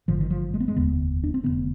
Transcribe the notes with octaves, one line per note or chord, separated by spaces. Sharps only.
G#1 G2 D3 F3
D#3
F3
G#3
B3
G#3
F1 D#2 D3 B3
D4
C4
F1 D#2 D3 B3